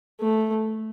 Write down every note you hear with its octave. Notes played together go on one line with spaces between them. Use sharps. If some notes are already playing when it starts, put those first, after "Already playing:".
A3